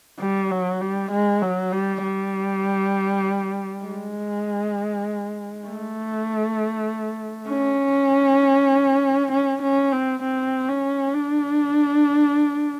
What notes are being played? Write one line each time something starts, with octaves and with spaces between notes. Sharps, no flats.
G3
F#3
G3
G#3
F#3
G3
G3
G#3
A3
C#4
C#4
C#4
C4
C4
C#4
D4